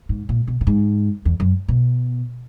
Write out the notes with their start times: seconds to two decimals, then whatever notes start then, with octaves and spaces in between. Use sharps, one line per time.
0.09 G#2
0.29 A#2
0.47 B2
0.61 A#2
0.67 G#2
1.25 E2
1.40 F#2
1.68 B2